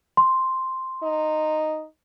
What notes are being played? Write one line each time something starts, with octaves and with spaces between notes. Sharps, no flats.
C6
D#4